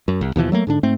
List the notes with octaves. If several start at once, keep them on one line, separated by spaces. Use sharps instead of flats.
F#2
C2
D#2 B2 E3 F3
F#3 A3 A#3
G#2 D3 D4
G#2 A3 C4